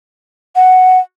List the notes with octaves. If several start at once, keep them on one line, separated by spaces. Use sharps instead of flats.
F#5